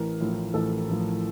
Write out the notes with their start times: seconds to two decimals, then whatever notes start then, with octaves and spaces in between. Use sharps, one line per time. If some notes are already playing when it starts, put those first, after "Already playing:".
Already playing: A1 A#4
0.20 A2 F3
0.54 A1 A4
0.89 A2 F3